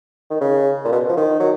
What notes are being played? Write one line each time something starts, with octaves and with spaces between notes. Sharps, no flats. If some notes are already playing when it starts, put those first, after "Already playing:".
D#3
C#3
A#2
B2
F3
D#3
F#3